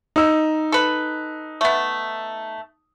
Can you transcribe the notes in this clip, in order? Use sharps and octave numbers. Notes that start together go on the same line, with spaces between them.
D#4 E6
A4 B4
A3 B3